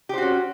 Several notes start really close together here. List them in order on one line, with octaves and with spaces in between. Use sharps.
G4 C5 F#4 C#4